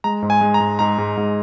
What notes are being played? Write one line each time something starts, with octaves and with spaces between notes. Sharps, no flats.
G#3 A#5
G#2
G#5
G#3
A#5
G#2
G#2 A#5
G#2
G#2